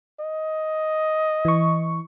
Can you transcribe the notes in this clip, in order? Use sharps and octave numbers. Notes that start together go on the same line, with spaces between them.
D#5
E3 C#6